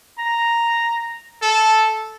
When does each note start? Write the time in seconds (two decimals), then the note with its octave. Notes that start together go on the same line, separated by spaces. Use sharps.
0.19 A#5
1.42 A4